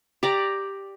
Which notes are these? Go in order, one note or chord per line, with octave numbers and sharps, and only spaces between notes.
G4 D5 A#5